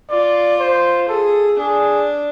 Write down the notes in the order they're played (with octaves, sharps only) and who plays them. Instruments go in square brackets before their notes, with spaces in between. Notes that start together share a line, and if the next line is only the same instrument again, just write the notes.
[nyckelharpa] F4 [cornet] D5
[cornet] C5
[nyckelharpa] G#4 [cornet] A4
[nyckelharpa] D4 [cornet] G#4